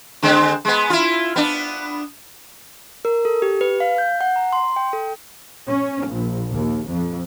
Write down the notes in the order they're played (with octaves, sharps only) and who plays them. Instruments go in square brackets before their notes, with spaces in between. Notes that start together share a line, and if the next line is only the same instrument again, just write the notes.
[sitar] D3 G#3 C4
G#3 B3
E4 F4
B3 D4
[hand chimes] A#4
A4
G4
B4
F5
G6
F#5
A#5
C6
G5
A4
[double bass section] C#4
A#1
D#2
F2